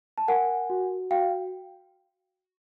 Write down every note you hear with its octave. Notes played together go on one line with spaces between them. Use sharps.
A5
A#4 F#5 G#5
F#4
F#4 F5 G5